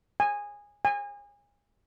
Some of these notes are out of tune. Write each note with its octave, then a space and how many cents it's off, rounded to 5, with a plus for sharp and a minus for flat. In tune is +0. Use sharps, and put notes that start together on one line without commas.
G#5 -15
G#5 -30